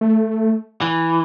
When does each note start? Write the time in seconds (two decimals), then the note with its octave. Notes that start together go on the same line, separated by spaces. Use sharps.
0.01 A3
0.81 E3